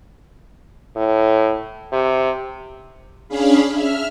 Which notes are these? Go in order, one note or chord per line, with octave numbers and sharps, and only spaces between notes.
A2
C3
C#4 D4 G#4 F5 B5
E5 F6